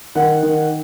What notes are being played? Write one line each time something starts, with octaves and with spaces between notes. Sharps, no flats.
D#3 F#5
D#3